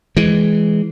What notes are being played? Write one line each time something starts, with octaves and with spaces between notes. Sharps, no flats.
E3 G#3